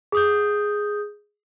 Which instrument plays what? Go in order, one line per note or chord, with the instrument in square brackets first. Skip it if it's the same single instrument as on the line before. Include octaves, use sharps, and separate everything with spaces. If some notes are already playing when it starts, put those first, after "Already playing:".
[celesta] G#4 D#6 G6